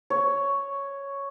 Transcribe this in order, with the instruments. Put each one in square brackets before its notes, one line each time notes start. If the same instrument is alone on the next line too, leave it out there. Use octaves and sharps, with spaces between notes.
[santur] C#5